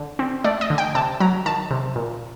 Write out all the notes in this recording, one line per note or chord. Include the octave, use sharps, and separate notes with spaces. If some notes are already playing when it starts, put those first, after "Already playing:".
Already playing: D3
C4
A3 D5
D#5
D3
G5
C3 A5
F#3 A#5
D#3 A5
C3
A#2